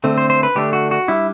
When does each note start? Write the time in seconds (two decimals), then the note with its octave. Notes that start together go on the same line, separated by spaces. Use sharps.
0.04 D3 A3 C4
0.18 C5
0.30 C5
0.43 B4
0.55 D3 A3 D4 G4
0.73 F#4
0.91 F#4
1.08 G3 D4 E4